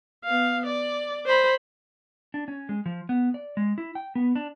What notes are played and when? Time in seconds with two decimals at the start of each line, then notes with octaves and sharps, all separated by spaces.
0.25 B3 F5
0.66 D5
1.26 C5 B5
2.34 D4
2.48 C#4
2.69 G#3
2.86 F3
3.09 B3
3.34 D5
3.57 G#3
3.78 E4
3.95 G5
4.15 B3
4.36 D4